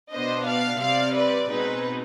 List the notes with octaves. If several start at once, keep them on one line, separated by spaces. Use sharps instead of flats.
B2 B3 D4 C5 D#5
D5 F5
C3 G3 C4 D5 F5
B4 D5
B2 G#3 C4 D#4 B4